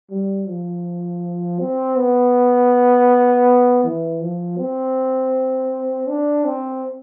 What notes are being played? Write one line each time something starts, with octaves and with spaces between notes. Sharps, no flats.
G3
F3
C4
B3
E3
F3
C4
D4
C4